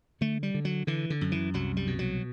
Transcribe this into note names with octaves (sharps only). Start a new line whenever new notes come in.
D3 A3
G3
D3
F#3
D3 E3
D3
F#2
E3
C2 F#3
G3
B2
F#3